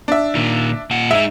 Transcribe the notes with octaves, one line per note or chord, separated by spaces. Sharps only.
D4 E5
A#2 D#3
A#2 F#5
G#3 D#4 E5